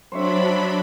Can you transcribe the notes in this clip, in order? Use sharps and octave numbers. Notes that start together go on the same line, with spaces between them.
F#3 D4 C5 C#5 E5 B5